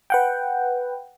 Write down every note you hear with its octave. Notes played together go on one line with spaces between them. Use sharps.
B4 F#5 G5